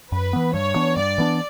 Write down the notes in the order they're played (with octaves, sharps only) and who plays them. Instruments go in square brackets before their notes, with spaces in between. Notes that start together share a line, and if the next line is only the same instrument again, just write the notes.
[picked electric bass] F#2 [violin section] B4
[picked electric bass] E3 B3
[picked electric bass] G2 [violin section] C#5
[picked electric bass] E3 B3 D4
[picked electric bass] G2 [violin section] D5
[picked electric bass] E3 B3 D4